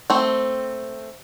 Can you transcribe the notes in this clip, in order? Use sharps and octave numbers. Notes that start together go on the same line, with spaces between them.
A3 C4